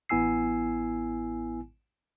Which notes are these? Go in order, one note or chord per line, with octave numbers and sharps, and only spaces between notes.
A1 B3 E4 G#5 E6 C7